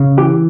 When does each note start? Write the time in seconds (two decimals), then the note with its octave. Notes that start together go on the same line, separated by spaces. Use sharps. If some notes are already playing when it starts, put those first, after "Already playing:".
Already playing: C#3
0.17 E3 G4